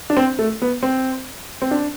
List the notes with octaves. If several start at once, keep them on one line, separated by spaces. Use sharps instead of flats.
D4
C4
A3
B3
C4
C4
D4